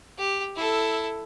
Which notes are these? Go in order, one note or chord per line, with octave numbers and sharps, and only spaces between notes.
G4
E4 A4